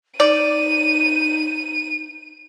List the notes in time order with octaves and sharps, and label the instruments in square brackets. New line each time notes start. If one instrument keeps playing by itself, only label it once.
[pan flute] D#4 [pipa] D5 [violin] D#7